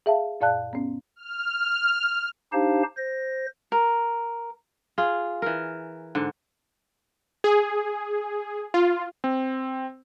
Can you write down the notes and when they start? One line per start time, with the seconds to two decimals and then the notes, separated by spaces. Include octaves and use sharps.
0.06 G#4 E5 F5 A5
0.40 F#2 A#2 D5 F5 A5 F#6
0.73 B3 C#4
1.16 F6
2.53 D4 D#4 G4 C5 F5 A5
2.97 C5 A#6
3.72 A#4
4.98 F4 G#4
5.42 E3 A#4
6.15 G#2 D3
7.44 G#4
8.74 F4
9.24 C4